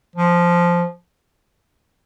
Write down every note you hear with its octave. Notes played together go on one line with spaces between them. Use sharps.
F3